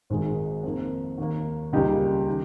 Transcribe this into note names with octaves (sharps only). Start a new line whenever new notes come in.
G#1 G#2 D#3 G#3
F2 D#3 A#3
D#2 D#3 A#3
C#2 C#3 G3 A#3 D#4 G4
D#3